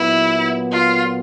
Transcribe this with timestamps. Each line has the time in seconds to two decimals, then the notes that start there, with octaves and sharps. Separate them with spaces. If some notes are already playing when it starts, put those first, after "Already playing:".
Already playing: A#2 F#3 B3 E4
0.72 F4